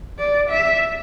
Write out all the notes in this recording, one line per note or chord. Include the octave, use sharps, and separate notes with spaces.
D5
E5